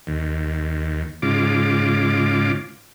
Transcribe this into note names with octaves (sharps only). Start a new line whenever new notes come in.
D#2
G#2 C#3 F4 D6